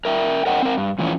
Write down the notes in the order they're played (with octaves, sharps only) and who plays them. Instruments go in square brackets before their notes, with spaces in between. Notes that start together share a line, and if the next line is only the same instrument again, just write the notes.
[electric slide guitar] A#4 E5 G5
A#4 C#5 D#5 F#5 G5
C4 A#4
G2
F2 A2 E3 F3 C#4